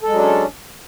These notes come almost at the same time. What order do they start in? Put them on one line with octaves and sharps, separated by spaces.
A4 G#3 F#3 D4 C#4